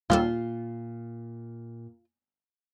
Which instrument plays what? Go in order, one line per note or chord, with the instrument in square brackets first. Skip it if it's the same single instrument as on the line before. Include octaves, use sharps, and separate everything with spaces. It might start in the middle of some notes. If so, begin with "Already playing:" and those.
[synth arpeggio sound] D#2 G3 A4 [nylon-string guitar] A#2 [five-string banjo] F4